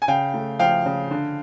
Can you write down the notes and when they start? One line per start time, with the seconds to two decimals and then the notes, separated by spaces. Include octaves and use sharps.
0.02 G#5
0.08 C#3 F5 G5
0.34 A3
0.59 F3 F5 G5
0.86 C#3
1.11 D3